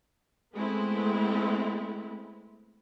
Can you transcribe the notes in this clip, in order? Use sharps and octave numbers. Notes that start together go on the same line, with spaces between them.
G#3 A3 B3 C4 E4